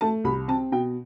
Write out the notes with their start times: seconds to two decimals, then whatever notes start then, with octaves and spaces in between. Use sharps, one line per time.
0.01 A3 A5
0.24 C2 B5
0.48 C4 A5
0.72 B2 G5